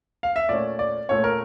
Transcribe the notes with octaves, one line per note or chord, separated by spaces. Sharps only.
F5
E5
A#2 A3 C#4 D5
D5
A#2 A3 C#4 C#5
A#4